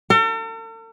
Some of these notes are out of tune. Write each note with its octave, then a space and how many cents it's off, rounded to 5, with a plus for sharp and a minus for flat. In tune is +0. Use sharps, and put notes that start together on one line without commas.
A4 +45